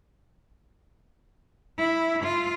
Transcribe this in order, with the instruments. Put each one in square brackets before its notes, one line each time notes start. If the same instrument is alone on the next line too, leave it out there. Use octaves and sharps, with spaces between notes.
[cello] E4
F4